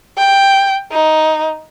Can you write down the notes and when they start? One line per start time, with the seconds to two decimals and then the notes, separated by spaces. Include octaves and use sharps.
0.17 G5
0.92 D#4